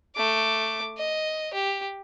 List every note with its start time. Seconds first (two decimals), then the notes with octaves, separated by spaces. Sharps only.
0.16 A3 D6
0.98 D#5
1.53 G4